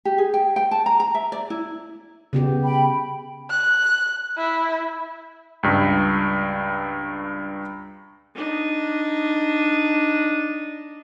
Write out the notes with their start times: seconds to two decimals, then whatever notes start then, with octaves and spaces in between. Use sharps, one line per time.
0.05 G4
0.18 G#4
0.34 G5
0.56 G5
0.71 A5
0.86 A#5
1.00 A#5
1.15 E5
1.32 D5
1.50 E4
2.33 C#3 B3 G4
2.63 G5 B5
3.50 F#6
4.38 E4
5.63 C#2 G2
8.35 D4 D#4